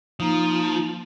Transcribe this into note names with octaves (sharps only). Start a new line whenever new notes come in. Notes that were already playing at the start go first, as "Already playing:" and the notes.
F3 A#3 D#4